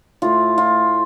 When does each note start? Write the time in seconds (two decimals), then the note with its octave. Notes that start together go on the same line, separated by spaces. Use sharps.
0.22 A2 A3 F4
0.58 F4